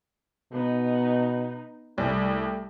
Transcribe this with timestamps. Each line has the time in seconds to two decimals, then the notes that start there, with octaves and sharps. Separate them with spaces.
0.52 B2 B3 D#4
1.98 C2 G3 A3